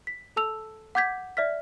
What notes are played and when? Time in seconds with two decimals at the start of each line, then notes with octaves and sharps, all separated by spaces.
0.07 B6
0.36 A4 A5 E6 F7
0.95 F#5 D6 G6 G#6 B6
1.37 D5 E5 F6 B6